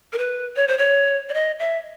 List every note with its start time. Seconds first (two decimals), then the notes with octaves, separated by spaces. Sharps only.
0.13 A#4
0.18 B4
0.56 C#5
0.68 C5
0.78 C#5
1.29 D5
1.34 D#5
1.59 E5